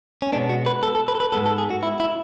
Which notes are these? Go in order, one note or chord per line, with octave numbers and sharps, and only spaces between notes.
C#4
B2 G#3 B3 D4
F#4
B4
A4
A4
B4
A4
B4
G#2 G#3 B3 A4
A4
G#4
F#4
E4
E4